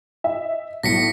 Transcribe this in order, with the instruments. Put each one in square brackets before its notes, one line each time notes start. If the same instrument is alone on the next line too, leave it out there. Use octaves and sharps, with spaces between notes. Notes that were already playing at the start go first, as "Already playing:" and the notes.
[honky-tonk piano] D#5 E5
[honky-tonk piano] B1 A2 [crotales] A#6 B6 C#7